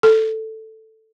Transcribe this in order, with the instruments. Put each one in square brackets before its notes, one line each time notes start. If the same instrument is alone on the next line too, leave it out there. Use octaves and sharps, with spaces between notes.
[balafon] A4